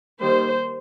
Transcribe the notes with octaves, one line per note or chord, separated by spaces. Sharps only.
D#3 G3 A#3 C5